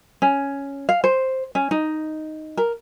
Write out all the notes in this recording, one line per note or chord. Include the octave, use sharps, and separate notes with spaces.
C#4
F5
C5
C#4
D#4
A#4